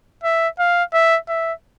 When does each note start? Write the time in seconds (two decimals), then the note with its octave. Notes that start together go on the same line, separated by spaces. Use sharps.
0.24 E5
0.59 F5
0.93 E5
1.29 E5